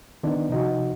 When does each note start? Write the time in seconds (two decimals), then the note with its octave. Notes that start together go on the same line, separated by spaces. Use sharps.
0.23 D#3 B3 D4 D#4
0.49 C3 F3 D#4 F#4